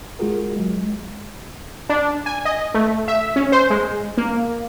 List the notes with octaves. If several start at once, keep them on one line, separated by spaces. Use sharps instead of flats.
G#3 F4 F#4 G#4 A#4
F#3 G#3
D4
G#5
D#5
A3
E5
C#4
C5
G#3
A#3